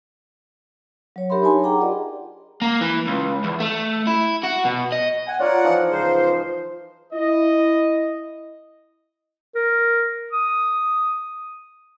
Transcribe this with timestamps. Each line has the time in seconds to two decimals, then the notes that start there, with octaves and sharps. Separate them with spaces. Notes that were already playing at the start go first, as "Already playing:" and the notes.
1.16 F#3 C#5
1.30 D4 G4 A#4 E5 B5 C6
1.43 D#4 C#5 G#5 A5 C6
1.63 G#4 F#5 G5 A#5 D6
1.80 F4 G4 G#4 A#4 D5 D#5
2.62 A#3
2.81 E3
3.07 C#2
3.44 E2
3.60 A3
4.07 E4
4.43 F#4
4.65 B2
4.92 D#5
5.27 F#5 G#5
5.39 F4 A#4 C#5 D5 F#5
5.64 E3 F3 D#4
5.90 C#2 C5
7.13 E4 D#5
9.55 A#4
10.32 D#6